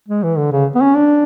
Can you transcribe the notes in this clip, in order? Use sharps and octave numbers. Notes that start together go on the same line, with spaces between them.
G#3
E3
D3
C#3
B3
C#4
D4